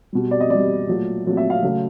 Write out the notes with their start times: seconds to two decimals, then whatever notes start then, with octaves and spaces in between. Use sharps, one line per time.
0.13 B2 G3
0.31 D5
0.40 D#5
0.50 B2 G3 D5
0.87 A#2 F#3 A3
1.25 A#2 F#3 A3
1.37 E5
1.50 F5
1.63 C#3 F#3 A3